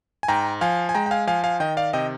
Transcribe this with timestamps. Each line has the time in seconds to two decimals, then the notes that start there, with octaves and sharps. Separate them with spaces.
0.23 G#5
0.28 G#2 G5 A#5
0.61 F3 F5 G#5
0.89 G#5
0.94 G#3 G5 A#5
1.06 G5
1.11 F5 G#5
1.27 F3 F5 G#5
1.44 F5 G#5
1.60 D#3 D#5 G5
1.77 D5 F5
1.93 C3 D#5 G5